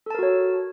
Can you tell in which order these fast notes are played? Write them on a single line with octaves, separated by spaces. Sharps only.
A4 A5 A#4 F#4 C#5